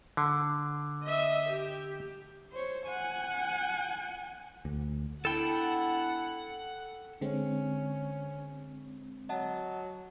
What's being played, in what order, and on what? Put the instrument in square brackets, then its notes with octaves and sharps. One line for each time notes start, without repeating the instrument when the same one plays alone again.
[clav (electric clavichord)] D3
[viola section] D#5 E5
G4
[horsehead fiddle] C5 C#5
F#5 G#5
[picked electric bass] D2
[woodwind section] B3 D4 E4 [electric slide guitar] A4 G5 [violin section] F#5
[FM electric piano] D3 G#3 C4 [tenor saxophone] C#4
[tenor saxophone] F#3 [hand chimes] D#5 F#5 A5